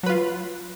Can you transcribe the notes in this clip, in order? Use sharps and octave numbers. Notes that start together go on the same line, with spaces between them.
F#3 F4 B4